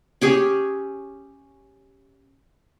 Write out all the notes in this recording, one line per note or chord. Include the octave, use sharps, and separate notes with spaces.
C#4 G4 G#4